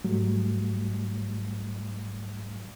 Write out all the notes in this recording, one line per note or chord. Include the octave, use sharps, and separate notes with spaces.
G#2 F#3 G3 A3